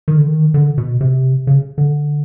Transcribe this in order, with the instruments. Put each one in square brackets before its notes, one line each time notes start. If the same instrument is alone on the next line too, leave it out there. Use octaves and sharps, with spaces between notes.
[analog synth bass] D#3
D3
D#3
D3
B2
C3
C#3
D3